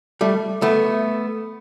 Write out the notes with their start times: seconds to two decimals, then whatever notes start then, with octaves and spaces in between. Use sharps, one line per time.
0.21 G3 A3
0.62 A3 B3